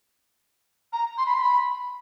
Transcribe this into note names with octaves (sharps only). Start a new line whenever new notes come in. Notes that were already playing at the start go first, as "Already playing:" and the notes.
A#5
C6
B5
C6
B5